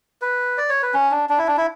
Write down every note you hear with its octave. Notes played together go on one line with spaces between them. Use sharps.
B4
D5
C#5
B4
C#4
D4
D4
E4
D4
E4